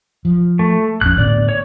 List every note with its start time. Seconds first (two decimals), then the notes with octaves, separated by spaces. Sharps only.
0.25 F3
0.59 A3
1.01 A#1 F2 C#4 F#6
1.18 A2 D3 B3 D5
1.49 C#5